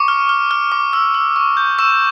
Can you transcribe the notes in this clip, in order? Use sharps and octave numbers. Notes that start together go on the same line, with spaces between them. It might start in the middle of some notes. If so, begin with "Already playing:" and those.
Already playing: C#6 D6 C#7
F6
F6
F6
D6
E6
E6
C#6
G6
C#6 E6 E7